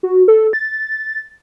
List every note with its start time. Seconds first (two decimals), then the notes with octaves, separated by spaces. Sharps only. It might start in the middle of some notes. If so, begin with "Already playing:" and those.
0.03 F#4
0.28 A4
0.53 A6